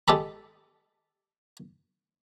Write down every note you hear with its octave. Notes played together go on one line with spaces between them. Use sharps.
G#3 G4 A4 B5